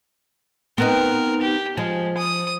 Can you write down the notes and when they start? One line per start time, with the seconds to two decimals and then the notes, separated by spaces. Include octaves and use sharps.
0.78 B3 C4 D#4 A#4
1.42 G4
1.77 F3 G#3
2.17 D#6